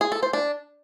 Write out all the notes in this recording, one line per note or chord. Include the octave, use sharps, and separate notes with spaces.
G#4
A4
C5
D4